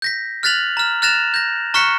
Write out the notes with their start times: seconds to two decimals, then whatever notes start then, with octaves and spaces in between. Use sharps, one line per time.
0.02 G6 A#6 B6
0.43 F6 F#6 A6 B6 F7 F#7
0.77 A#5 F6
1.02 F6 F#6 A6 A#6 E7 F7
1.34 G6 A#6
1.74 A#5 C#6 F6 F#6 B6 C#7